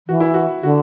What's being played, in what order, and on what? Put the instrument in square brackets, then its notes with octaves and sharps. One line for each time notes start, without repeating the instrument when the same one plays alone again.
[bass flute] E3 [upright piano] F#4
[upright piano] E4
F#4
[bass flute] D3 [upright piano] F#4